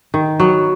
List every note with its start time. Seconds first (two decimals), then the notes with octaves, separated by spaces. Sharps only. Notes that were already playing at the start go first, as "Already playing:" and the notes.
0.14 D#3
0.40 F#3 B3